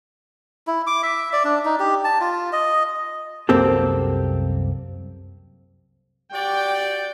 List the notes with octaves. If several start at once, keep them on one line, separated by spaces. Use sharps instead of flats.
E4
D6
E5
D5
D4
D#4
G4
A5
F4
D#5
C2 F#2 A#3 C4 G4 A4
F#4 G4 D5 G5